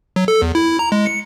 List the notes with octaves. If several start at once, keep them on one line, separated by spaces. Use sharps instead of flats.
F#3
A4
E2
E4
A#5
G#3
C#7